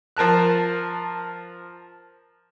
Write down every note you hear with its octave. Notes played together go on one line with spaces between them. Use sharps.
F3 A#4 A5 F#6